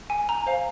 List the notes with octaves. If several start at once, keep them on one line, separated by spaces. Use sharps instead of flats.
G#5
A#5
C5 F5